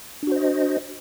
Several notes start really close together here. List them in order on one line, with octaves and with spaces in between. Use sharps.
D4 F#4 C5 D#5